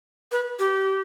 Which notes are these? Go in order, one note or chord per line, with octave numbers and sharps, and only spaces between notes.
B4
G4